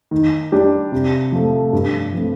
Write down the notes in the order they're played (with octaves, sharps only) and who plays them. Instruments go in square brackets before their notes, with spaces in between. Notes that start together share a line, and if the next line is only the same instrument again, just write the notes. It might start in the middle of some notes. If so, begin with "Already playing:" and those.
[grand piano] D#3
G3 D4 G4
C3
F3 A3
G2
F3 A3 C4